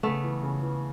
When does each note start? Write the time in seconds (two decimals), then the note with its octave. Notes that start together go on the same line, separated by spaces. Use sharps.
0.03 C#3 A3 B3
0.23 E3
0.43 C#3
0.62 E3